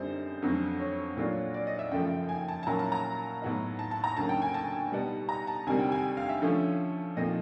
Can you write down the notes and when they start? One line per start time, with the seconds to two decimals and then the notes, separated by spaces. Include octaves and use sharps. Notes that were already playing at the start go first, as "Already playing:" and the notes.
Already playing: F#2 D3 G3 C4 D#4 C5
0.42 F2 D3 F#3 A3 C#4
0.80 C#5
1.16 A#2 F#3 A3 D4 F4
1.54 D5
1.67 D#5
1.79 E5
1.91 F#2 C#3 F3 A3 G5
2.29 G#5
2.48 A5
2.63 A5
2.67 A#2 F#3 A#3 C#4 E4 A#5
2.79 A5
2.92 A#5
3.42 A2 F#3 B3 D#4
3.79 A5
3.91 A5
4.04 A#5
4.17 D2 C#3 F#3 A#3 A5
4.29 G5
4.42 G#5
4.54 A5
4.92 B2 G3 B3 D#4
5.29 A#5
5.47 A5
5.66 D2 C3 D#3 G3 C4 G#5
5.79 G5
5.92 G#5
6.17 F5
6.29 E5
6.42 D3 F3 A3 C#4
7.17 A#2 F3 A3 C4 D#4 D#5